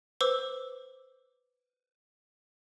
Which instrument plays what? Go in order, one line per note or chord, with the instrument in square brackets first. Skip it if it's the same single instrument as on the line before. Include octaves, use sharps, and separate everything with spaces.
[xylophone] B4 C5 D6 E6